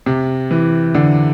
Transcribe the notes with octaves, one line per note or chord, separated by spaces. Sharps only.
C3
E3
D3